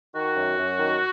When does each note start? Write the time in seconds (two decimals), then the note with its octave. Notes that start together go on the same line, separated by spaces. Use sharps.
0.14 D#3 F#4
0.36 F#2
0.57 F#2
0.78 D#3